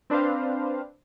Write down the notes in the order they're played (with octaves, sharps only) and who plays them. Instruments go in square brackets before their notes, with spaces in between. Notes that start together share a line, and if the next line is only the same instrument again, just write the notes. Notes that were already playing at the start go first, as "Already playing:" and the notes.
[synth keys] C4 D4 B4 C5 F5